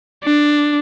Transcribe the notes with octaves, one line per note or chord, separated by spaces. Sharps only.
D4